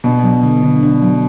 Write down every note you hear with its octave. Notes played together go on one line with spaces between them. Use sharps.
B2 D4
F#3
D3
D3
D4
F#3